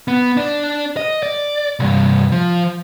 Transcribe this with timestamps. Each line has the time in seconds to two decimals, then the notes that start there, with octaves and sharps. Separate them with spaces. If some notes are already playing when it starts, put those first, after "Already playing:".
0.08 B3
0.37 D4 D5
0.97 D#5
1.23 D5
1.80 C2 G2
2.32 F3